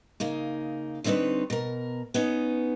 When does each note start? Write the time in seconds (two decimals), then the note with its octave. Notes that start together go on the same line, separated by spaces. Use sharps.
0.20 C#3 A#3 D#4
1.04 D3 G3 C4 D#4 B4 C#5
1.50 B2 A#4
2.14 B3 C#4 D#4